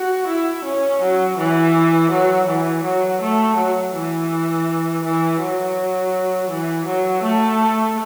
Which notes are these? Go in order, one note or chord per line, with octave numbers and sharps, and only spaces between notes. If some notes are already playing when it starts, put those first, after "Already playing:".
Already playing: F#4
E4
C#4
F#3
E3
F#3
E3
F#3
A3
F#3
E3
E3
F#3
E3
F#3
A3